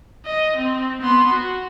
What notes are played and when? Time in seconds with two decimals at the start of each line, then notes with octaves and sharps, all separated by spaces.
0.26 D#5
0.57 C4
1.01 B3 C6
1.32 F#4